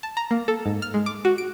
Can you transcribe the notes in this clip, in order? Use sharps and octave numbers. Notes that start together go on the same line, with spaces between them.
A5
A#5
A#3
A4
G#2
F6
G#3
D6
F#4
D7